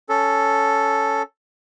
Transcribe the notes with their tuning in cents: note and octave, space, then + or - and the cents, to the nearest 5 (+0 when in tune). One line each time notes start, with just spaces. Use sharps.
C#4 +10 A4 +0